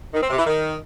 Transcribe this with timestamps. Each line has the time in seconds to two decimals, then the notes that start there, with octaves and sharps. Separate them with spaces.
0.14 D#3
0.22 C4
0.30 C3
0.38 E3
0.47 D#3